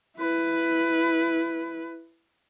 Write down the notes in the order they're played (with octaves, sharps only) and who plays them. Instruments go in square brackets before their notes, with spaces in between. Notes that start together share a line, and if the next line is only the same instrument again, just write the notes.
[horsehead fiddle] E4 B4